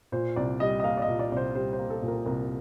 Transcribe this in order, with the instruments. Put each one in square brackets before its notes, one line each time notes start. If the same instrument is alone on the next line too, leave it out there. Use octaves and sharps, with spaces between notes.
[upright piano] A#2 C5
C2 D5
G3 D#5
D#5
A#3 F5
D5
D#5
A#2
D5
C2 D5
C5
G3 C5
C5
A#3
A4
A#2
A#4
C2 A#4